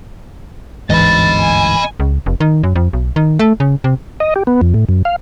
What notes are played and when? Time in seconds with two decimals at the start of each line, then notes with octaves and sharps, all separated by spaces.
0.90 G1 D2 G#2 E3 D#5 B5 A6
1.40 G#5
2.00 C#2
2.26 F1
2.40 D#3
2.63 F#2
2.75 F2
2.93 B1
3.16 D#3
3.39 A3
3.60 C#3
3.84 C3
4.20 D#5
4.36 G4
4.47 B3
4.61 F2
4.74 A2
4.89 F#2
5.05 F5